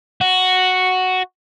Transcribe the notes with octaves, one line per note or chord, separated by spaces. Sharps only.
F#4